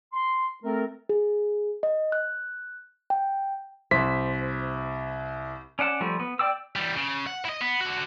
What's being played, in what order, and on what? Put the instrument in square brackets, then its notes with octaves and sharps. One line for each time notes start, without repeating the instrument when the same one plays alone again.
[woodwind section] C6
A3 C4 A4 A#4
[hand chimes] G#4
D#5
F#6
G5
[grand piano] C2 [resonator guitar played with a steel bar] C5 [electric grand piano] B6
[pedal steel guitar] C#4 D5 F#5 A5
F3 G3 A3
B3
D5 G5 D6 E6
[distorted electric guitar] E3 G3
C#3
F#5
E4 D#5
B3
D3 F#4